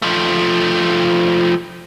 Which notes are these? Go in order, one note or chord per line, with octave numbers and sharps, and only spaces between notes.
F3 A3